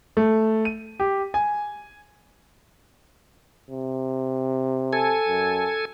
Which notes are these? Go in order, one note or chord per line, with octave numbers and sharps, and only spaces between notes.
A3
D#7
G4
G#5
C3
A4 G#5
F#2